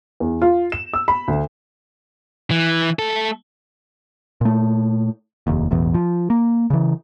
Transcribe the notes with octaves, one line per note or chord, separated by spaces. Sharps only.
E2
F4
E7
E6
B5
D2
E3
A3 A4
A#2 A3
F1 D#2
E1 A1 E2
F3
A#3
C#3 E3